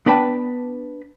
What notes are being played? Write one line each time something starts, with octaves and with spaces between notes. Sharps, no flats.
B3 D4 B4 G5 A5